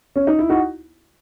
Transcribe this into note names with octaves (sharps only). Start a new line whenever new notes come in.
C#4
D#4
E4
D#4 F#4